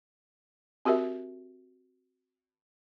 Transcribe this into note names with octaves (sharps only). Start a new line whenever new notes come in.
C4 F#4 G4 A#4 E5